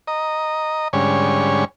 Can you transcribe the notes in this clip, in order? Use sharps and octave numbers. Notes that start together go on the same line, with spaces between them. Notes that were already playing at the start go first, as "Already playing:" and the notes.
D#5 A#5
G#2 D3 G3 C#4 C#5 G#5